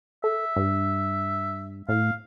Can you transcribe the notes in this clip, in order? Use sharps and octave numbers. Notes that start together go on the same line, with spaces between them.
A4 E5
G2
A2 F5